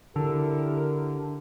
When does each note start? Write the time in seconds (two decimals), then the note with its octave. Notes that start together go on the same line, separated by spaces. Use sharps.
0.16 D3 E4 G4 A#4